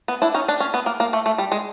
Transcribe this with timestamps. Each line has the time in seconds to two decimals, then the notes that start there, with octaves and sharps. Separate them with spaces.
0.08 B3
0.22 D4 E4
0.34 C#4 D#4
0.48 D4
0.60 C#4
0.74 B3
0.86 A#3
1.00 A#3
1.13 A3
1.26 A3
1.38 G3
1.52 G#3